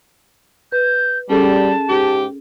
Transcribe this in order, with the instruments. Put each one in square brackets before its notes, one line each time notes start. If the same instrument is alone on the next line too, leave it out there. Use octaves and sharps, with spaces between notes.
[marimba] B4 [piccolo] G6
[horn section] G3 [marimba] C#4 G#4 A4 [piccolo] A5
[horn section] G#2 G4